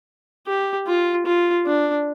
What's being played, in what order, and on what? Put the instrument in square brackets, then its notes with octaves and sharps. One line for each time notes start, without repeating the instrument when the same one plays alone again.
[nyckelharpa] G4
F4
F4
D4